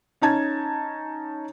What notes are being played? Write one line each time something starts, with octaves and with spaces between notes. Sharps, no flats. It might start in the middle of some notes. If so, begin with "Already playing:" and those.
C#4 D#4 A5 G#6